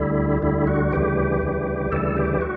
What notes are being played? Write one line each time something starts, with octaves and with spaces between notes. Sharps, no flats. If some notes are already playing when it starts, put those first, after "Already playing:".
Already playing: D2 D3 G3 E4
D2 D3 G3 E4
F#4
D2 C#3 E3 G3 G4
D2 C#3 E3 G3
D2 C#3 E3 G3 A4
G4
F#4